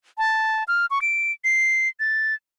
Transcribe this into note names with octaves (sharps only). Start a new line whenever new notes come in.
A5
F6
C#6
D7
C7
A6